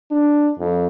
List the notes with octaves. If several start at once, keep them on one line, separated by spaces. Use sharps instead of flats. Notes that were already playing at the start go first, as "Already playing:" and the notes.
D4
F2